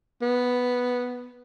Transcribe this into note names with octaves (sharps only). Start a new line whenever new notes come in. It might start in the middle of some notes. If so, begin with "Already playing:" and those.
B3